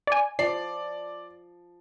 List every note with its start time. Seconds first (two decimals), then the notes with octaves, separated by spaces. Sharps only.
0.07 D5 G#5
0.39 F3 D5 C7